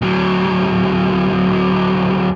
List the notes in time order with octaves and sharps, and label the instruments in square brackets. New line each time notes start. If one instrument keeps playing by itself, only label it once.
[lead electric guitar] D2 F#3